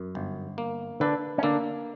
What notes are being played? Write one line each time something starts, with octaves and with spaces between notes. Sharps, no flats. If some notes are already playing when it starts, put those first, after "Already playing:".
Already playing: F#2
G1
A#3
D3 D4 B4
C#4
D3 A#3 D4